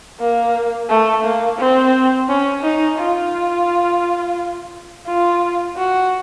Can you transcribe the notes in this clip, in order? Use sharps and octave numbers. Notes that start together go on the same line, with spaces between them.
A#3
A3
A#3
C4
C#4
D#4
F4
F4
F#4